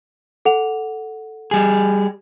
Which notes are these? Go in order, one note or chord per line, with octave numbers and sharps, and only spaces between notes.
A4 F#5 F7
G3 G#4